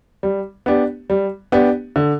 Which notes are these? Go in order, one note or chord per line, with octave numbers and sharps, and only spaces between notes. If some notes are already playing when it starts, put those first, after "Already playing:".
G3
B3 D4 G4
G3
B3 D4 G4
D3